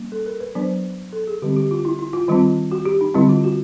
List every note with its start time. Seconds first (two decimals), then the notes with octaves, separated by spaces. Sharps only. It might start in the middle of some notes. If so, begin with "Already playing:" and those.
Already playing: G3 A#3 C#4
0.12 A4
0.26 A#4
0.40 B4
0.55 F#3 B3 D4 C5
1.13 A4
1.27 G#4
1.42 D3 G3 C4 G4
1.56 G4
1.71 F4
1.85 E4
1.99 E4
2.13 F4
2.28 D#3 G3 C4 F4
2.71 F#4
2.85 G4
3.01 D#4
3.14 D3 G3 C4 E4
3.29 F4
3.44 F#4